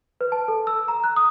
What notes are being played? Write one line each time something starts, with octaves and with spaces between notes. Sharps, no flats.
B4
A5
A4
E6
A#5
F#6
D#6